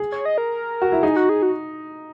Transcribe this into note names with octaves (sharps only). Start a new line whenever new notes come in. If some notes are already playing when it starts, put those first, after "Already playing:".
Already playing: G#4
C#5
D#5
A#4
F#4
E4
D#4 G#4
F#4
G#4
F#4